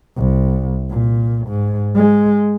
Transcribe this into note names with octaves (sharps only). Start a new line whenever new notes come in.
C2
A#2
G#2
G#3